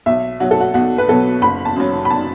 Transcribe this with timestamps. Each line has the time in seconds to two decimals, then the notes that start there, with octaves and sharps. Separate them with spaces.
0.06 B1 E5
0.40 B2 F#3 F#4
0.51 A4
0.60 F#4
0.74 B1 F#4
0.98 B4
1.08 B2 F#3 A4
1.42 F#1 B5
1.65 A5
1.76 F#2 F#3
2.05 B5
2.10 A5